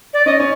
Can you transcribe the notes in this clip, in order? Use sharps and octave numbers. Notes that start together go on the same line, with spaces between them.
D5
C#4 D#5
C#4